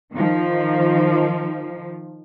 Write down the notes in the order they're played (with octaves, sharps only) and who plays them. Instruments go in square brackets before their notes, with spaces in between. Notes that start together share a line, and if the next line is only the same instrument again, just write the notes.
[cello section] D#3 F3